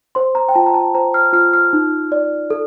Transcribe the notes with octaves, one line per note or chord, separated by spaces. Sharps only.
C5 C6
A#5
G5
F4 A5
A#5
A5
C5 A#5
F6
F4 F6
F6
D#4
D5
A4